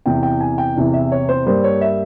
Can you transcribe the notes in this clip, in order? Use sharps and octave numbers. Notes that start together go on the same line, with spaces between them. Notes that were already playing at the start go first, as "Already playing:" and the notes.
E2 C3 E3 G5
G5
G#5
G5
E2 C3 E3
E5
C#5
C5
G2 G3 A#3 C5
C#5
E5